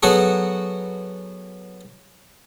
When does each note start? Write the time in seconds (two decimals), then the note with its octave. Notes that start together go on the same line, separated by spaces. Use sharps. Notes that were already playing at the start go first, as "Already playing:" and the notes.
0.03 F#3 B3 F#4 G#4 A4 C#6